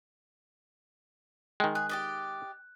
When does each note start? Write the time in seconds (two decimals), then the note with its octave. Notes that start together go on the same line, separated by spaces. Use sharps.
1.60 D#3 G#3 G5
1.75 G#4 F#6
1.89 G4 D5 D#5